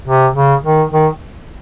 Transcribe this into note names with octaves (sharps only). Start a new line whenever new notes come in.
C3
C#3
D#3
D#3